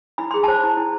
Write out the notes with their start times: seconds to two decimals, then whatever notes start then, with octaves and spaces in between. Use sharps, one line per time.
0.18 E4 B5
0.31 G#4 C6
0.43 C5 A5 B5
0.63 E4
0.77 E4